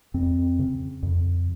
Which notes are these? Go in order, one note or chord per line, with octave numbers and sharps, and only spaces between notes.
F2 C4
C#3
F2